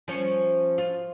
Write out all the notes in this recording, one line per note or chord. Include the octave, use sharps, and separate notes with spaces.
F3 C#4 C#5
F4